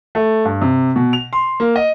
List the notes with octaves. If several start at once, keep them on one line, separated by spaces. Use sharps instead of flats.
A3
G2
C3
B2
F7
C6
A#3
D#5